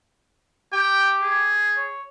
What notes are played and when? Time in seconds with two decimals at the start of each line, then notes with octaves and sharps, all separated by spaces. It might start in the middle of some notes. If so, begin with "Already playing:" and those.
0.73 G4 G5
1.22 G#4
1.77 C#5